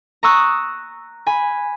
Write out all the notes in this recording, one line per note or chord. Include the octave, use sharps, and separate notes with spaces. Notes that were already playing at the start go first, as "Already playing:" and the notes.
A#5 C#6 D#6 E6 F#6
G#5 B5